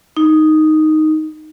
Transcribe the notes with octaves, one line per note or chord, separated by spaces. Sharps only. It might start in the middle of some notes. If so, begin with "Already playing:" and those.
D#4